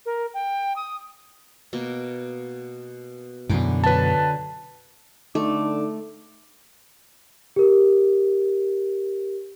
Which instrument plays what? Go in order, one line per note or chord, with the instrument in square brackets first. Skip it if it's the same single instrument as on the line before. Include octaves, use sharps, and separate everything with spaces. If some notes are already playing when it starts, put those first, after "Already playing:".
[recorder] A#4
G5
D#6
[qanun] B2 A#3
[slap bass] F#2 B2 [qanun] D3 E3 D6
[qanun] D3 F#3 [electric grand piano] B4 A5
[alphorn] D3 [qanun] A3 [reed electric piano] D#4 [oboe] D6
[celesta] G4 A#4